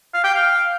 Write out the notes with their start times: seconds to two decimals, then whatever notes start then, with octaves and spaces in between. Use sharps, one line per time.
0.14 F5
0.24 G5
0.34 F5